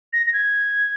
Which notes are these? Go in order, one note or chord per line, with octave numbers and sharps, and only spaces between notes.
A#6
A#6
G#6